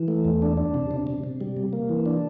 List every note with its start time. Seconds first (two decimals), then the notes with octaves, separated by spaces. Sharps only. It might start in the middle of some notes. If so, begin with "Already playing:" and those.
Already playing: E3
0.08 A3
0.25 E2
0.42 D4
0.57 D4
0.74 C3
0.91 C3
1.07 C3
1.24 C3
1.41 G3
1.57 C3
1.73 A#3
1.89 E3
2.06 D4